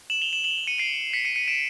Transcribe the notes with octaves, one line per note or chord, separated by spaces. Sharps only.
E7 F#7
F7 G7
E7 F#7
E7 F#7
C#7 D#7
C7 D7
B6 C#7
C#7 D#7
C#7 D#7
D7 E7